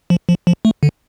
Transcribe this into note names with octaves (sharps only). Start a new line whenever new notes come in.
F3
F3
F3
A3
D3